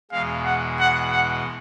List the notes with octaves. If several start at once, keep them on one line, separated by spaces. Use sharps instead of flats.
E2 B2 G#3 F5
F#5
F#5
F#5